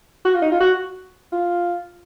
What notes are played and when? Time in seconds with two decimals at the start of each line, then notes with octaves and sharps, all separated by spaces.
0.25 F#4
0.34 F4
0.42 D#4
0.52 F4
0.60 F#4
1.33 F4